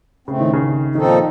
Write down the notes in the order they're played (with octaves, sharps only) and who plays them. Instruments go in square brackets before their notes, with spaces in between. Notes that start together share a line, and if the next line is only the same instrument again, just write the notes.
[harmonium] A2 A3 C4 [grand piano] C#3
[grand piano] D#3
C#3
[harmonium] A#2 F3 C4 D#4 A4 [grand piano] D#3